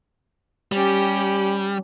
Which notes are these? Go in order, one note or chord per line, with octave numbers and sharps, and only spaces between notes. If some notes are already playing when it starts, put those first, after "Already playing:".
G3 C#4 G4